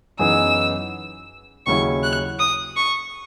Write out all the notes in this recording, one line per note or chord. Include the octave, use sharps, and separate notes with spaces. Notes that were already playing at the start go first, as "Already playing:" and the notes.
F#2 E3 B3 D#4 G#4 E6
D#2 C#3 F#3 C#4 E4 C#6
F#6
D#6
C#6